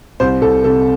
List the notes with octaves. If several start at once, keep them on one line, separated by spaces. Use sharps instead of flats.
C2 C5
C2 A4
C3 A4